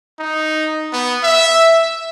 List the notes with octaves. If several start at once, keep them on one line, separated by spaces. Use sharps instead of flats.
D#4
B3
E5